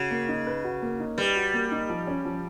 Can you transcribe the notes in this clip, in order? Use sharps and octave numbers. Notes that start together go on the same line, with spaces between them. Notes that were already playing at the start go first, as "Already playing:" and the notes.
Already playing: C#3 F#4
A#3
D#4
B4
F#4
A#3
D#4
G3 B4
F#4
A#3
D#4
F3
C#4
F3